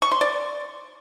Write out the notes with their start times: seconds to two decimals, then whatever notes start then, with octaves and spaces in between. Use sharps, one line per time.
0.02 C#6
0.11 C6
0.21 D5